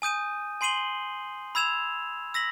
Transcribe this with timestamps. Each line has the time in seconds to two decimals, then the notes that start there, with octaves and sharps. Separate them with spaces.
0.02 G#5 D#6 G6 D#7
0.61 G#5 C6 C7 D#7 F#7 G7
1.55 B5 E6 G#6 E7 F7
2.34 E6 A#6 B6 F#7